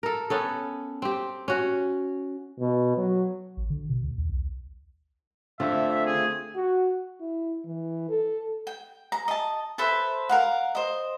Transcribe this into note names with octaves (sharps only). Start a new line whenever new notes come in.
A4 A#4
B3 C#4 A4
C4 G4
C#4 F#4
B2
F#3
A1
D3
B2
D2
D#2
B1
D3 A3 C4 F4 E5
G#4
F#4
E4
E3
A4
G5
A#5
D#5 A5
A4 B4 C5 E5
A#4 F5 F#5
C5 D#5